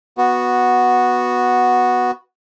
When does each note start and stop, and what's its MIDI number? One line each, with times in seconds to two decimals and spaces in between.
0.18 2.11 59
0.18 2.11 66